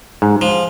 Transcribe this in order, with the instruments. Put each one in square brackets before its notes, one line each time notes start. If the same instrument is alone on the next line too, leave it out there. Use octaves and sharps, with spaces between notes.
[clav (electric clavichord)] G#2
[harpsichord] F3